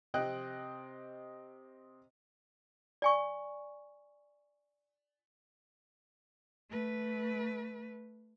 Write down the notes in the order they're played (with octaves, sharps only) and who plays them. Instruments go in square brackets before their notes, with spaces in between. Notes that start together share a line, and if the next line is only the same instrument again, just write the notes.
[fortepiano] C3 C4 D#5 G5 F#6
[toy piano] D5 G#5 C#6
[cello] A3 B4